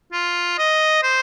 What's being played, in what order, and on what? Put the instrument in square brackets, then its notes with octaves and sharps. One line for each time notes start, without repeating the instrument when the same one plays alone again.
[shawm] F4
D#5
C5